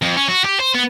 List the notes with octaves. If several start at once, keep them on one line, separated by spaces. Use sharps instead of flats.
F2
C#4
F#4
G4
C5
B3